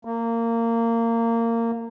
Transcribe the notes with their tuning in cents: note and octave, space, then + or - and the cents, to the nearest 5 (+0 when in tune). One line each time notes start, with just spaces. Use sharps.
A#3 -20